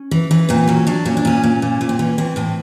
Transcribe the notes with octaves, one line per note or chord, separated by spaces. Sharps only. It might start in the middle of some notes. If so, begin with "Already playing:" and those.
Already playing: C#4
E3
E3
A#2 C4
F#3 C#4
F#3 D4
A#2 C#4
D4
A#2 C#4
A#2
A#2
A#2
C4
E3 C#4
E3 C4
A2 C4